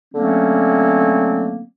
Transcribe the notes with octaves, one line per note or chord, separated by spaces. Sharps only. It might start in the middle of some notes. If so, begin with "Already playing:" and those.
D3 F#3 A3 A#3 C4 C#4